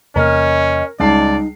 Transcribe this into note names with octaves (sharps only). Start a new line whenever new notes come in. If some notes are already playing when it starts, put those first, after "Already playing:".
E2 C3 A#3 C#4 A#4 D#5 F6
C#2 G3 D#4 D5 A5 C7